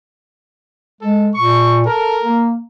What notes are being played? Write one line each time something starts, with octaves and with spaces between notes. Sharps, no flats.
G#3 A4
A#2 C#6
A4 A#4
A#3